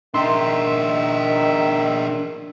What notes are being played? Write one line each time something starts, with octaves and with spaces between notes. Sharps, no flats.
D#3 D4 A#4 E5 C6